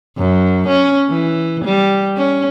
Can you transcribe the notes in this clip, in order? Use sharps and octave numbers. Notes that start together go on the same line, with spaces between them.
F#2
C#4
E3
G3
C#4